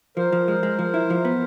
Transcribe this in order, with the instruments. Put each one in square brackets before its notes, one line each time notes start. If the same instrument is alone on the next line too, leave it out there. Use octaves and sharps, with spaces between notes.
[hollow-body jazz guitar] F3 [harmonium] A#4 C5
[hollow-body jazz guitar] F3
G#3
G#3
F3
E4
F3
B3